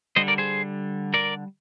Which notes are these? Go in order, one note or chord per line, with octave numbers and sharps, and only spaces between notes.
D3 G3 C5 D#5
A#4 D5
G#4 C5
A#4 D5